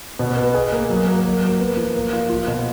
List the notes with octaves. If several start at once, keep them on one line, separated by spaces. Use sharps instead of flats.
B2
B3
G#4
A#3
F#3
A#3
F#3
A#3
B3
F3
A#3
F4
F4
B2